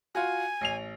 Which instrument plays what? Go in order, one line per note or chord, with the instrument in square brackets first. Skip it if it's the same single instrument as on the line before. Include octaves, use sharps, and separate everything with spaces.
[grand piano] F4 F#4 [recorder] G#5
[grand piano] A1 C7 F7